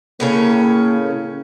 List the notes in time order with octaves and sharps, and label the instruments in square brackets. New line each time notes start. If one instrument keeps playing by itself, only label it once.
[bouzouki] A2 C#3 C#4 [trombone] A#3